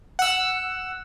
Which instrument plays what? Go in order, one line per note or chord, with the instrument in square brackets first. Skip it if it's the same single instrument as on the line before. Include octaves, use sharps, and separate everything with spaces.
[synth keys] F#5 E6